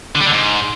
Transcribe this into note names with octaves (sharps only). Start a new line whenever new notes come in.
D3
G3
D3
G#2